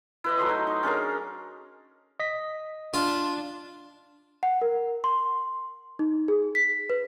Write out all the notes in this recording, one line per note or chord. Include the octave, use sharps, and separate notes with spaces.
E4 B4 D#5
F#3 A3 C6 D#6
D#4
D#4
C#4 D4 G#4 A#4
D#5 B6
D4 F4
F#5
A#4
C6
D#4
G#4
B6
B4